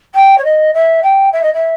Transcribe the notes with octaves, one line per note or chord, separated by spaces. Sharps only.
G5
C#5
D#5
E5
G5
E5
D#5
E5